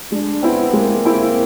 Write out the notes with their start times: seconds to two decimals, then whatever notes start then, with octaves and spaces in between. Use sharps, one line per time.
0.12 G#3 D4
0.43 B3 C4 E4
0.73 G#3 A#3
1.05 C4 E4